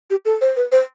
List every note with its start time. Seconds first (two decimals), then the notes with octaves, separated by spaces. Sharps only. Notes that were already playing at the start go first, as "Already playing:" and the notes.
0.10 G4
0.25 A4
0.41 C5
0.56 B4
0.72 C5